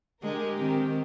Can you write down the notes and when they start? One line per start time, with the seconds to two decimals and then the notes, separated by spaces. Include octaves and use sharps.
0.22 D3 G#3 G4 A#4
0.58 D#3 C4